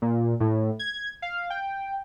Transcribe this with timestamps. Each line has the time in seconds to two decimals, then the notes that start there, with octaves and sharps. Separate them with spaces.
0.02 A#2
0.40 A2
0.79 G#6
1.22 F5
1.50 G5